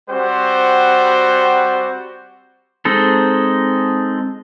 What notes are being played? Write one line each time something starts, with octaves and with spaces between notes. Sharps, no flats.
G3 C4 F#4 C5 F#5
G#3 C4 D#4 A4